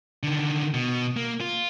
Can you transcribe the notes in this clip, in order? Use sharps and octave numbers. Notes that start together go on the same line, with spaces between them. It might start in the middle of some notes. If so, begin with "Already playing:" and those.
D3 D#3
B2
A#3
F4